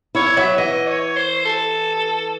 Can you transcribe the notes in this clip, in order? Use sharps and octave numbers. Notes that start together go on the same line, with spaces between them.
E4 C#5
F#3 E5
E3 D#5
C#5
C5
A4